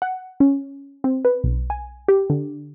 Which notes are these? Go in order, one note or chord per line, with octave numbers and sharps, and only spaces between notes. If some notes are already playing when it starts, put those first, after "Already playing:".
F#5
C#4
C4
B4
B1
G#5
G4
D3